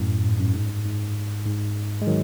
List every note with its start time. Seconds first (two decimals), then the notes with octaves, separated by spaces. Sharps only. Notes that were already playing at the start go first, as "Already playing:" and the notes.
Already playing: F#2 A2
0.24 G#2
0.39 F#2
0.54 G#2
0.85 G#2
1.46 G#2
2.02 G#3
2.07 D#3 F#3